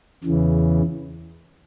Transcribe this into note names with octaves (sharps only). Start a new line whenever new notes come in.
E2 C#3 E3